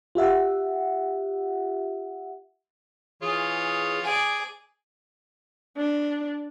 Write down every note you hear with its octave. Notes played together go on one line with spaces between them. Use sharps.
F4 G4 E5 F#5
E3 F4 G#4 C#5
G#4 D5
D4